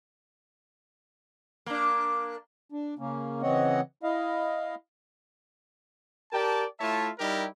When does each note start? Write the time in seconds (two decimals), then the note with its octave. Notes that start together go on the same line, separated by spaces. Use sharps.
1.66 A#3 D4
2.72 D4
2.99 C#3 A#3 C#4
3.42 C#3 E3 C4 C#5 D#5 F#5
4.03 E4 D#5 F5
6.32 G4 A#4 D5 G5 A5
6.80 A3 E4 F4 C#5 E5 A5
7.18 G3 D#4 E4 G4 A#4